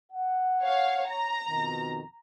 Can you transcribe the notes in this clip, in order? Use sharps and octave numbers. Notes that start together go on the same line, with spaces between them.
F#5
C#5 F5
A#5
F2 B2 D#3